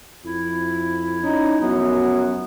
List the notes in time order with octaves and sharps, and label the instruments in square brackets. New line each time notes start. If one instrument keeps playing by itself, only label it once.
[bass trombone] F2 [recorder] E4
[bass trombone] C#4 [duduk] D#4
[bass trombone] F1 [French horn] F#2 [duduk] B3